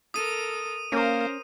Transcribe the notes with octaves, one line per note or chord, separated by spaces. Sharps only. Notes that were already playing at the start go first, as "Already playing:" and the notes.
A4 A#4 D#6 D#7
A#3 C#4 A#4 C5